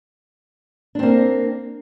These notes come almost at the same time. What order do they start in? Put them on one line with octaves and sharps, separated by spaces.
D4 C4 A#3